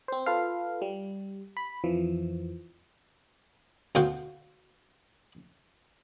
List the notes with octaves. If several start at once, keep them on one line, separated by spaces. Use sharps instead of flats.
C4 C5
F4 A4 B4 F5
G3
B5
F2 E3 F3
D2 B2 F#4 F5 G5 C6